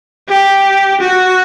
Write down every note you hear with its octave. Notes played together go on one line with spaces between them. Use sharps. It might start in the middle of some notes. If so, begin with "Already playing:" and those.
G4
F#4